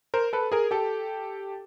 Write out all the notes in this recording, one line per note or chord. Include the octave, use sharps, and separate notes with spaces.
A#4 C5
A4 B4
G#4 A#4
G4 A4